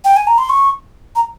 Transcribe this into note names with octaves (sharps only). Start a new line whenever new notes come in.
G5
G#5
A#5
C6
C#6
A#5